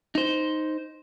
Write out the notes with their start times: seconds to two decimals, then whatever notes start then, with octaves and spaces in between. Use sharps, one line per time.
0.15 D#4 C5